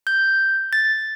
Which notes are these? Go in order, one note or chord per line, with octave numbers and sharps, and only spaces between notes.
G6
A6